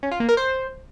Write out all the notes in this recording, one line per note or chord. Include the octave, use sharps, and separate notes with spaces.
C#4
F4
A#3
A#4
C5